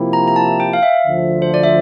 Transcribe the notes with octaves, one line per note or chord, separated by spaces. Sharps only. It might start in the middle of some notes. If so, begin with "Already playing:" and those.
Already playing: C3 F3 A#3 E4 G4
A#5
A#5
A5
G5
F5
E5
D2 D3 F3
C5
D5
E5